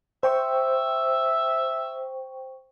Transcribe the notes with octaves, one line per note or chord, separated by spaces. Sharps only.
C5 E5 G5 C#6